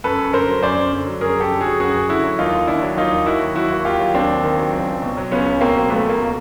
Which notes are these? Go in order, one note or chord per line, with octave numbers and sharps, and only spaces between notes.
F#2 A4 B4
F#2
D3 A#4 C5
F#3
F#2 C5 D5
F#2
D3
F#3
F#2 G#4 A#4
F#2 G4 A4
D3
F#3 F#4 G#4
F#2 F#4 G#4
F#2
D3 E4 F#4
F#3
D#2 D#4 F4
D#2
D#3 D4 E4
F#3
D#2 D#4 F4
D#2
D#3 E4 F#4
F#3
D#2 E4 F#4
D#2
D#3 F4 G4
F#3
D#2 C4 D4
D#2
D#3
F#3
C#2
C#2
B2
F#3
C#2 B3 C#4
C#2
B2 A#3 C4
F#3
C#2 A3 B3
C#2 A#3
B2